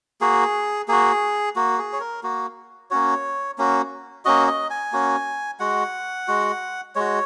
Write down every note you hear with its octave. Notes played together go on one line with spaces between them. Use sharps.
A#3 F#4 G#4
A#3 F#4 G#4
A#3 F#4
G#4
C#5
A#4
A#3 F#4
A#3 C#4 F#4 C#5
A#3 C#4 F#4
A#3 C#4 F#4 D#5
D#5
G#5
A#3 C#4 F#4
G#3 F#4 F#5
G#3 F#4
G#3 F#4 C#5